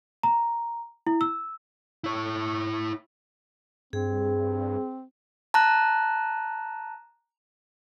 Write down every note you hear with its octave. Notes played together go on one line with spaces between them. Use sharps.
A#5
E4
E6
E4 C#5
G2 C4 G#4
A5 A#5 F#6